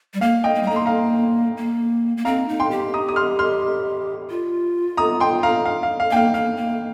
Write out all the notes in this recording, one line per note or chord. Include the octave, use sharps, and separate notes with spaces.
G3
A#3 F5
D#5 G5
A#3
G3
A#3 A#5
C6
F5 A#5
A#3
A#3
C4 F5 A#5
D#4
G5 C6
G4
A#5 D#6
D#6
C6 F6
C6 F6
F4
A#5 D#6
G5 C6
F5 A#5
F5
F5
F5
A#3 G5
F5
A#3 F5
A#3